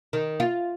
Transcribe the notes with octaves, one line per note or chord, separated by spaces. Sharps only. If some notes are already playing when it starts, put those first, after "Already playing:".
D#3
F4